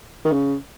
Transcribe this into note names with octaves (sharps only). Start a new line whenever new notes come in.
D#3
C#3